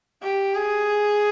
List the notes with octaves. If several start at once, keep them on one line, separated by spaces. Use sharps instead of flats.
G4
G#4